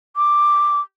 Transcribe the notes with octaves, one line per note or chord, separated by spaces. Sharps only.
D6